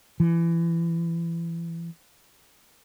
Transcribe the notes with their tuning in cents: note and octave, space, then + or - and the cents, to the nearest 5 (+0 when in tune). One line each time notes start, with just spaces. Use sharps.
E3 +25